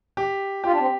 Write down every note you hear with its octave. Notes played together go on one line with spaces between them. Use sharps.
G4
F4 G4
D4
C4